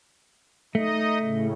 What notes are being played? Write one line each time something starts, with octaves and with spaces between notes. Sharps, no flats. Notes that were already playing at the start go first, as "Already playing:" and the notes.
A3 D#4 D#5
A2 C#3